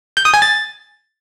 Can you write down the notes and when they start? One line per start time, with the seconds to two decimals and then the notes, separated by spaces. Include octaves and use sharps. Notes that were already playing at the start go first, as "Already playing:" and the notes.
0.17 G6
0.25 D#6
0.34 G#5
0.42 A6